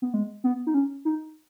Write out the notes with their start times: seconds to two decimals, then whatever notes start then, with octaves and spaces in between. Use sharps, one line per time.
0.02 B3
0.14 G#3
0.44 B3
0.67 D#4
0.74 C#4
1.05 D#4